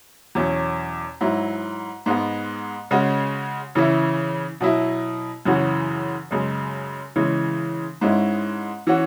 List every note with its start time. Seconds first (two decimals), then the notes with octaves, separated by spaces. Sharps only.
0.35 E2 B2 F#3 C#4
1.21 G#2 F#3 E4
2.06 G#2 G#3 B3
2.91 C#3 G#3 C#4 F#4
3.75 C#3 E3 C#4 E4
4.60 B2 F#3 E4
5.45 F#2 C#3 E3 C#4 F#4
6.31 F#2 C#3 G#3
7.16 C#3 E3 G#3 C#4
8.01 G#2 G#3 C#4 E4
8.87 E3 C#4 F#4